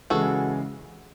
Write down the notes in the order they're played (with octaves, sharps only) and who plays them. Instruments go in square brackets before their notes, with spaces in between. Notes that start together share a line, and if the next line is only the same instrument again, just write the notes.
[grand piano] C#3 E3 G#3 [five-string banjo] F#4 A4